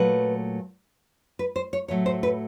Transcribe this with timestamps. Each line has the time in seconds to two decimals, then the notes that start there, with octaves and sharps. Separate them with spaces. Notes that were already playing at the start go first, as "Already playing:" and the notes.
Already playing: A#2 F#3 A3 B4
1.39 B4
1.56 C5
1.73 C#5
1.88 A2 F#3 A3 C#5
2.06 C5
2.23 B4